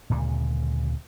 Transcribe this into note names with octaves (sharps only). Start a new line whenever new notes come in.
D2 A#2 C#3 G#3